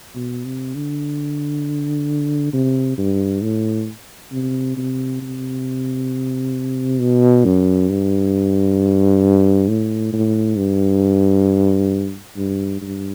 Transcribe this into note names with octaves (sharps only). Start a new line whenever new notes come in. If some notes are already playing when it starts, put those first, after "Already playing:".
B2
C3
D3
C3
G2
A2
C3
C3
C3
B2
F#2
G2
A2
A2
G2
G2
G2